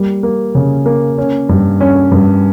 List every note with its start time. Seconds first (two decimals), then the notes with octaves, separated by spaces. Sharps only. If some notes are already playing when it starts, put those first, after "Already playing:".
Already playing: G3 A#3
0.23 A#3
0.55 C#3
0.86 A#3
1.18 C#4
1.49 G2
1.81 C#4
2.12 G2